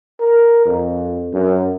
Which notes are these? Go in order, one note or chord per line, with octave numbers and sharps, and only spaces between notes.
A#4
F2
F#2